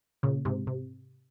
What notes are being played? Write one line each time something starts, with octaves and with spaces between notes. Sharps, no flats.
A#2 C#3
G#2 C3
C3